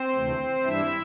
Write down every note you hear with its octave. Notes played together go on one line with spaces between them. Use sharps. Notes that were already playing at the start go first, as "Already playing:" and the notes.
Already playing: C4 C5
D2 C3 E3 A3
G2 E3 G3 D4 E4 E5